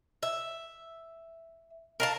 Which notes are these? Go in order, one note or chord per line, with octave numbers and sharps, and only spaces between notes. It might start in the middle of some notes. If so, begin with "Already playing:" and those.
E5
A#4 F5 A5